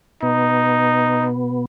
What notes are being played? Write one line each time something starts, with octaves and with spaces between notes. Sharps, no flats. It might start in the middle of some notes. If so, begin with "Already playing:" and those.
B2 B3 D#4